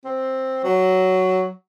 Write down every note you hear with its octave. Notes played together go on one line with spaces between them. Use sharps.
C4
F#3